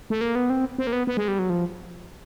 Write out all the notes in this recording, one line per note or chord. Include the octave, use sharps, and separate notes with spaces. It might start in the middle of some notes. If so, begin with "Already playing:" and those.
A3
A#3
B3
C4
C4
A#3
B3
B3
G#3
G3
F#3
F3